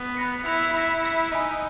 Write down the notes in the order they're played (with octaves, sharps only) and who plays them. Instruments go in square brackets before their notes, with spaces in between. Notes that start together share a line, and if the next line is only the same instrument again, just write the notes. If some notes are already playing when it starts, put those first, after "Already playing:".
Already playing: [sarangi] B3
[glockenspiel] B5 F#6 A#6 C#7
[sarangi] E4 [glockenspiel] B5 F#6 A#6 C#7
[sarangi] E4 [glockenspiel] B5 E6 A#6 C#7
[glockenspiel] B5 E6 A#6 C#7
[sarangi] D#4 [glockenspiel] G#5 B5 E6